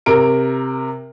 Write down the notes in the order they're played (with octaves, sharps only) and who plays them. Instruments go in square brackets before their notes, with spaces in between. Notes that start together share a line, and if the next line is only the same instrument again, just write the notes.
[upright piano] C3 A#4 D7